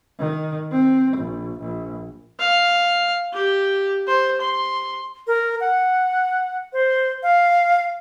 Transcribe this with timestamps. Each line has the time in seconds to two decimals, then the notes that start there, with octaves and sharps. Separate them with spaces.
0.19 D#3
0.72 C4
1.17 A#1
1.60 A#1
2.39 F5
3.33 G4
4.07 C5
4.41 C6
5.27 A#4
5.60 F#5
6.73 C5
7.23 F5